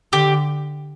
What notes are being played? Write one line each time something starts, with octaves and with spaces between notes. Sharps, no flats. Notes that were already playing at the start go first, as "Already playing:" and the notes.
D3 G4